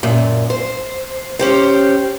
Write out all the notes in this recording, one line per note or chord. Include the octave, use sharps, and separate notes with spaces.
F#2 A#2
C5
C#4 G4 C5